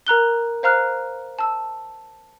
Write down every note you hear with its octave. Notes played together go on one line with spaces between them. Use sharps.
A#4 A#5 F#6 G7
C5 F5 A#5 F6 F#6
A5 E6